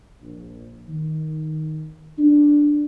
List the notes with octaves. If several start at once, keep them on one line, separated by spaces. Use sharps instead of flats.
A#1
D#3
D4